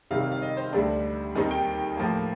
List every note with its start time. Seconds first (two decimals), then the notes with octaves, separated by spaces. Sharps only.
0.11 C3 D#3 G3 F5
0.21 F5
0.32 F5
0.42 D#5
0.57 C5
0.73 D2 D3 G3 D4
1.35 D#2 D#3 G3 C4 D#4
1.51 G5
1.97 A2 F3 A#3